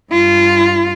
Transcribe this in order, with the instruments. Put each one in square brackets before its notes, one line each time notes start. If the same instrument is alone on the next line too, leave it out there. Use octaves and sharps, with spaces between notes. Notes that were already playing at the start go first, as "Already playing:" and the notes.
[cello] G2 F4